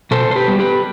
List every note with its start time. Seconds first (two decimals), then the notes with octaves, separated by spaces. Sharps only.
0.11 B2 A4 C5
0.31 C5
0.36 G4 B4
0.48 G3 B3
0.59 G4 B4